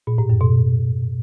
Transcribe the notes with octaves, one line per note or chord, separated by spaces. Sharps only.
A#2
A2
F#2
B2